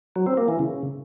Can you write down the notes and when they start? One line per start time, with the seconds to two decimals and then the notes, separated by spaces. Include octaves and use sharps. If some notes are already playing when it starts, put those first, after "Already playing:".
0.16 F#3
0.27 C4
0.37 A#3
0.48 E3
0.59 C#3